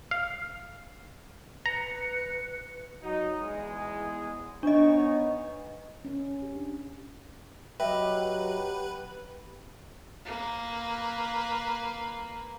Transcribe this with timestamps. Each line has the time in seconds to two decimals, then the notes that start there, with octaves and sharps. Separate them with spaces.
0.11 F5
1.66 B4 A#5 C#7
3.03 F#3 D#4
3.39 E2 G#3
4.63 B3 D4 D#4 C#5 D#5
6.05 C#4
6.42 G4
6.55 D4
7.80 F#3 G4 B4 D#5 E5 G5
10.25 A#3 B4